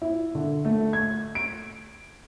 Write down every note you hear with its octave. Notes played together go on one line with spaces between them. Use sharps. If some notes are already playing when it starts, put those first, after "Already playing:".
E4
D3
A3
G#6
D7